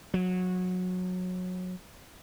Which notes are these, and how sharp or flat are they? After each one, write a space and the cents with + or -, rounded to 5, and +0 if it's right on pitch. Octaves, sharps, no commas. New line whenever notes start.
F#3 -20